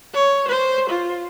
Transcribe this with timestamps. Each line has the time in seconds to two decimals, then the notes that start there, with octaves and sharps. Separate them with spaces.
0.13 C#5
0.48 C5
0.89 F4